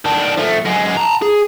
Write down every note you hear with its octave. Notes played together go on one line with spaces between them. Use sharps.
D#3 D4
F3 A3
F#2 G#3
A5 A#5
G#4